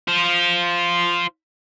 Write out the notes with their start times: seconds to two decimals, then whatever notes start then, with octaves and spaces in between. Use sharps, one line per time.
0.08 F4 C5